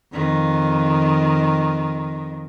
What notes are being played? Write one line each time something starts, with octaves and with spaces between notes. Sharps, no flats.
F2 D#3